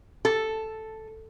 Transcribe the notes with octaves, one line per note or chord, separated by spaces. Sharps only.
A4